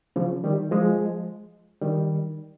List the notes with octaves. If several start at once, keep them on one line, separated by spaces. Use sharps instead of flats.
C#3 F3
D#3 G3
F3 G#3
D#3 G3